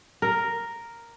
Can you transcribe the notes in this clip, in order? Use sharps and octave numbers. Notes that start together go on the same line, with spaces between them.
A#4